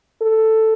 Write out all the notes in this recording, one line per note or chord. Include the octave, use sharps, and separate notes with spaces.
A4